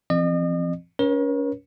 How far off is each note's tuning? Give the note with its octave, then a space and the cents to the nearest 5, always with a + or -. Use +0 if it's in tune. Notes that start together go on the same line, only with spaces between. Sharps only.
F3 -45 C4 +0 D#5 -40
C#4 +30 A#4 +40 C#5 -25